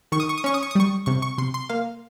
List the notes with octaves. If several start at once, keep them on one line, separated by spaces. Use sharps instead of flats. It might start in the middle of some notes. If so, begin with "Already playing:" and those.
D#3 C#6
D#6
C#6
D#6
C#4 C#6
D#6
C#6
D#6
G3 C#6
C3 C#6
C#6
C3 C6
C6
A#3 F5